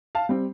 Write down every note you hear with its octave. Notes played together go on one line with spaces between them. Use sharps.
F5 A5
G3 C4